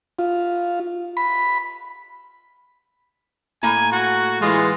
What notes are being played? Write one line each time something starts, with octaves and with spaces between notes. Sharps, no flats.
F4
B5
A2 A#3 G#5 A#5
F#4
E3 G#3 F4